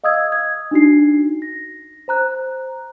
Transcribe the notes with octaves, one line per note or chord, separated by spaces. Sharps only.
D#5 F5 D#6 E6 G#6
G#6
D4 D#4 F#4 C7
A#6
C5 A#5 F#6